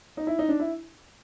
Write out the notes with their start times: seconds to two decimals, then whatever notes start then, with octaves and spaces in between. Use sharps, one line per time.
0.17 D#4
0.27 E4
0.39 D#4
0.49 D4
0.60 E4